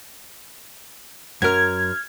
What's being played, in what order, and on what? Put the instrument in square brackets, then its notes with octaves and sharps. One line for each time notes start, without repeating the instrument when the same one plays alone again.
[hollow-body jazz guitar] F#2 A#4 [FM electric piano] F6 G#6